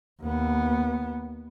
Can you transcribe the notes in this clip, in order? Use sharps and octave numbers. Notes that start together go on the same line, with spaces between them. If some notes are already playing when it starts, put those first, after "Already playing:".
D#2 B3